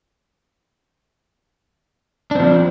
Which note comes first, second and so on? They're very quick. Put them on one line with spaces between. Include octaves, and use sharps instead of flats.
D4 C4 F3